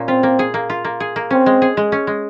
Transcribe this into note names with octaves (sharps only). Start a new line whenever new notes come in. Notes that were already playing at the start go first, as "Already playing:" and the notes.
Already playing: A#2 C#4
C4 F4
A#3
G#4
A#3
F4
A#3
G#4
A#3
C4 C#4
G#3
G#4
G#3
C#4
G#3